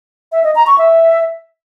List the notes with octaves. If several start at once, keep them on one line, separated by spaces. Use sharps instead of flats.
E5
D#5
A#5
C#6
E5